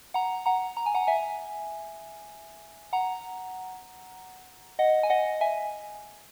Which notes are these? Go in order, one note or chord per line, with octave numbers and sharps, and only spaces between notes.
F#5 A#5
F#5 A#5
A#5
G#5
F#5 A#5
E5 G#5
F#5 A#5
D#5 F#5
G#5
D#5 F#5
E5 G#5